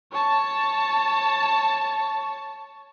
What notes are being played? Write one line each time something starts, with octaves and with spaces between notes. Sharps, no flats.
C#5 A5